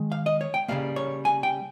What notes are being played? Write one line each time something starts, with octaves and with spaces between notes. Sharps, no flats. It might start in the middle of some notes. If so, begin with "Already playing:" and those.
Already playing: D#3 G#3
F5
D#5
C#5
G5
C#3 G3 A#3 F5
C#5
G#5
G5